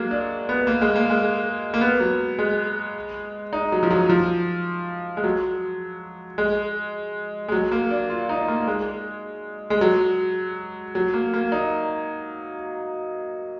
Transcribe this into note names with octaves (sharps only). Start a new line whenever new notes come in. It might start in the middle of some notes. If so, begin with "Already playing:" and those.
Already playing: F#3 G#3 A#3
D4
B3
A#3
G#3
A#3
G#3
A#3
B3
F#3
G#3
D#4
F#3
F3
F#3
F3
G#3
F#3
G#3
G#3
F#3
A#3
D4
F4
D#4
A#3
G#3
G#3
F#3
F#3
A#3
A#3
D#4